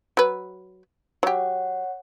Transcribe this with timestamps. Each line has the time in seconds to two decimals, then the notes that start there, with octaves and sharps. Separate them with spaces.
0.17 F#3 B4
1.23 F#3 G4 C#5 F#5